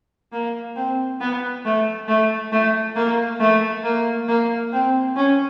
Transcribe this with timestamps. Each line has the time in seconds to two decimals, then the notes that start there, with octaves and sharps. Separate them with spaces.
0.32 A#3
0.76 C4
1.21 B3
1.65 A3
2.08 A3
2.52 A3
2.96 A#3
3.40 A3
3.84 A#3
4.28 A#3
4.73 C4
5.16 C#4